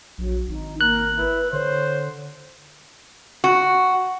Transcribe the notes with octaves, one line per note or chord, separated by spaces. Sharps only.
A#1 F#3
G#1 D#4
A#3 A#4 F#6
E4 B4
D3 C5 C#5
F#4